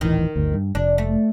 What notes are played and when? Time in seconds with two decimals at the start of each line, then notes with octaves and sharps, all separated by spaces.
0.01 D#1 A1 D#3 E3
0.36 G1 D2
0.54 G2
0.75 F1 D4
0.98 A3